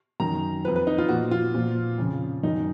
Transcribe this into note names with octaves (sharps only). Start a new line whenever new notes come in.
F#2 D#3 A#5
F2 F3 B4
B4
D#4
F4
A#2 F3 F#4
F4
A#2 F3
F2 C#3 F3
F#2 D#3 D#4